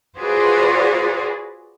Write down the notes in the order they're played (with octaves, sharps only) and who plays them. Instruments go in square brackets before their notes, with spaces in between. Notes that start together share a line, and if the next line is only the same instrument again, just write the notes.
[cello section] F4 F#4 G#4 B4 C5 D5